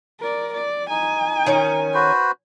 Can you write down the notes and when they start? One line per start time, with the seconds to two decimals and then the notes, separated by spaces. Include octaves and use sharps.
0.20 A#4 D5
0.54 D5
0.90 D#4 G#5
1.46 D#3 C#4 A#5
1.94 F#4 B4 C5